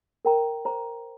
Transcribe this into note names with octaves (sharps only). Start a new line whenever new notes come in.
A#4 G5 A#5
C5 A#5